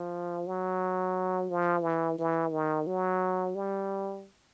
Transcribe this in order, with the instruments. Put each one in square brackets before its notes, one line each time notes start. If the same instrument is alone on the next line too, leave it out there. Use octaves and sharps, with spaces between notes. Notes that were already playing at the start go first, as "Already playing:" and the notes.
Already playing: [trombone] F3
F#3
F3
E3
E3
D#3
F#3
G3